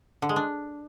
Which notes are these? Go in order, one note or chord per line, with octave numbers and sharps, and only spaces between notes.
D3
G#3
D4